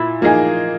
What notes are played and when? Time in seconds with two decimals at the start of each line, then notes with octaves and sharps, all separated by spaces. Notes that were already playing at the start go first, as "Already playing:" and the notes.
Already playing: A#2 E4
0.21 F3 A#3 D#4 G#4